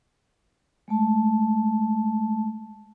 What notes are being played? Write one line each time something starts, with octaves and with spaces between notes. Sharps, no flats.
G#3 A3 A5